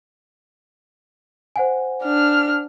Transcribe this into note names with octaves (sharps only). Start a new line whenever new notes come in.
C5 F#5 G#5
D4 F6